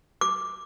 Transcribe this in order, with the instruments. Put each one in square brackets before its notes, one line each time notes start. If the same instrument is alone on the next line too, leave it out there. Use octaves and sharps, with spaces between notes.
[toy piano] D6